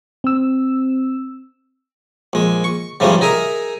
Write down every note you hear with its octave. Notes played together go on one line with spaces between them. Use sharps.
C4 E6
A#1 G#3
C#6
G#2 C#3 E3 F3 G3 A3
D#4 G#4 A#4 E5